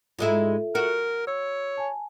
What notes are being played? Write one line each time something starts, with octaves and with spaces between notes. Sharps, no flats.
G#2 G#3 E4 F4 A4 E5
F#4 A#4
C#5 E6
G#5 A5